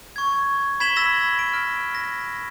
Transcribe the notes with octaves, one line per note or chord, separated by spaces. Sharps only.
C#6 G#6
B5 G#6 B6 E7 F#7 G7
E6 A#6 E7
D7
F6
A#6